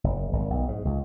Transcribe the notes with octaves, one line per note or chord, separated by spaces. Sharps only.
F#1
G#1
B1
G#2
C#2